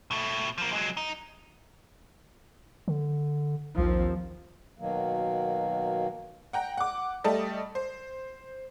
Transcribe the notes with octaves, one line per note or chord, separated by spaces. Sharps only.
B2 A3
F3 A#3
F#3 G#3
D#4
D3
A#1 D#2 F3 C4
B2 D#3 F#3 A#3
F#5 G5 A#5
F#5 D6
G3 A3 D#5 A5
C5